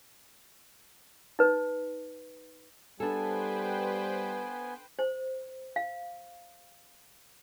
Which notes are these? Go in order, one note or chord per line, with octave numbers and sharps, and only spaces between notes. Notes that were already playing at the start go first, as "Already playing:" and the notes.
D#4 B4
G3 B3 D4 A4 B4 C5 G5 G#5
C5
F5